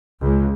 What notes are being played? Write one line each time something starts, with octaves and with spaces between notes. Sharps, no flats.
C#2